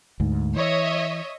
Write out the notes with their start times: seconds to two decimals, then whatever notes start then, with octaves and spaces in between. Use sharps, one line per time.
0.20 D2 G#2
0.56 E3 C#5 D#5 E5